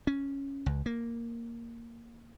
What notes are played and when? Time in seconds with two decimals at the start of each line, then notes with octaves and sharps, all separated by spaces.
0.07 C#4
0.66 C#2
0.86 A#3